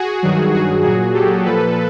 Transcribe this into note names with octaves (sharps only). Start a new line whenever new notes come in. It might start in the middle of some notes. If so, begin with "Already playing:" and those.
Already playing: F#4 G#4
G2 D#3 F#3
F#4 G#4
A#2 F#3 F#4 G#4
G4 A4
A#2 F3 A4 B4